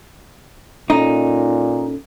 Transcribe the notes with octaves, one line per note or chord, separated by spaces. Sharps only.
A#2 C#4 D#4 A4